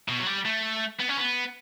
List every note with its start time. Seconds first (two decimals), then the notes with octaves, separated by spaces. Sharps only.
0.08 B2
0.20 F#3
0.27 G3
0.45 A3
1.00 B3
1.09 C#4
1.18 B3